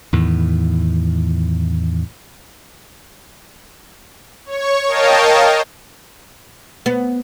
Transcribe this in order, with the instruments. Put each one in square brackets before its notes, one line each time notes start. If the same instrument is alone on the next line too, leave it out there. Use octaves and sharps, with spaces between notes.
[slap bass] E2 A2 D#3
[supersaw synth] C#5 C#6
A#4 C#5 D#5 F5 G5 A5
[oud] B3